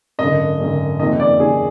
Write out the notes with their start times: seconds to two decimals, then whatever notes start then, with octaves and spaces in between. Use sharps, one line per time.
0.19 G#1 F#2 D3 D#5
0.59 G#1 F#2 D3
0.99 F#1 F2 D#3 D#5
1.20 D5
1.40 F#1 F2 D#3 G#4